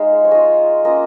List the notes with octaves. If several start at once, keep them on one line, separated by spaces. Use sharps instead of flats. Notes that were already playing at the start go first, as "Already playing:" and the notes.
Already playing: G#3 D#4 F4 F5
C#5
G#3 F4 D#5
A#3 C#4 F4 D#5